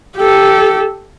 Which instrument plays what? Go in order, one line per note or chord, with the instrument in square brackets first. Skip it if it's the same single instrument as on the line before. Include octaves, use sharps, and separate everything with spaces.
[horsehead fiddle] G4 A4